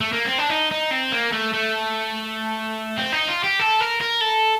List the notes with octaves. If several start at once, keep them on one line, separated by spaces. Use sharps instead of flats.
A3
A#3
C4
D4
D#4
D#4
C4
A#3
A3
A3
C4
D#4
F4
G4
A4
A#4
A#4
A4